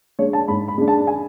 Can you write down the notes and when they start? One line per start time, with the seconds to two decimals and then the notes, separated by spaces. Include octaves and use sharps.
0.19 G#3 D4 C#5
0.33 A5
0.48 G#2 B5
0.68 B5
0.78 G#3 D4
0.88 A5
1.07 G#5